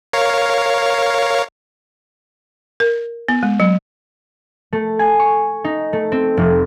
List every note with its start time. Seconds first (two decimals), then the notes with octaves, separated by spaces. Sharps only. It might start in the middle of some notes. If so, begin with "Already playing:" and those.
0.13 A#4 C#5 F5
2.80 A#4
3.28 B3
3.43 G#3
3.60 F#3
4.73 A3
4.99 G#5
5.19 C#6
5.64 D#4
5.93 A3
6.12 C4
6.37 F1